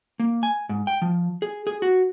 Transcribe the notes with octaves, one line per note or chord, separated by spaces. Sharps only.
A#3
G#5
G#2
G5
F3
G#4
G#4
F#4